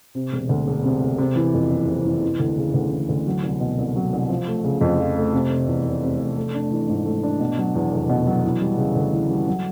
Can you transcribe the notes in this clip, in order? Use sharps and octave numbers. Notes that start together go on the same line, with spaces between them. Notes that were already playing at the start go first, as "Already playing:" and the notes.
C3
E1
D2
E1
C3
E1
C3
E3
F2
F#1
C3
E3
E3
D2
C#3
D2
E3
D2
F#3
C2
B2
C2
F#3
C2
F3
A3
C#3
F2
F3
A3
C3
F1
E2
F1
C3
F1
A3
D4
E3
G#2
A3
D4
B2
F#3
E2
F1
B2
F#3
E3
G3
C#3
D2
E3
G3
F#3